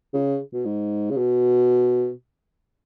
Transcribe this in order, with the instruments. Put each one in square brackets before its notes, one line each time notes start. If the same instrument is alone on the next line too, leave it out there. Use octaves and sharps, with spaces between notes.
[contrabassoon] C#3
B2
G#2
C#3
B2